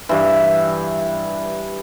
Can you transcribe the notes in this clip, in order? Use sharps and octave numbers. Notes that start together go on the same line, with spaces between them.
G2 E3